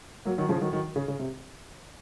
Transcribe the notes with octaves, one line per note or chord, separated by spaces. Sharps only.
F#3 A#3
D#3 F#3
C#3 F3
D#3 F#3
D#3 F#3
C#3
C#3
C3